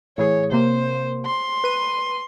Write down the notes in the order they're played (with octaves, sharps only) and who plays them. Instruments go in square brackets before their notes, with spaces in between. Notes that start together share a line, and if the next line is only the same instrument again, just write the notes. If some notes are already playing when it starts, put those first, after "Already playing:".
[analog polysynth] A2 E3 G#4 [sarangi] C#5
[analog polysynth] C3 A#3 [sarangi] C5
[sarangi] C6
[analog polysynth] B4 D#7